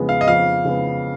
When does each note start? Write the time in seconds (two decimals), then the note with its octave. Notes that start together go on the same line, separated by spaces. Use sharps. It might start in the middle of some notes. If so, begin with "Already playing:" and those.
Already playing: F2 C#3 G#3 B3
0.09 F5
0.21 D#5
0.27 F2 F5
0.65 C#3 G#3 B3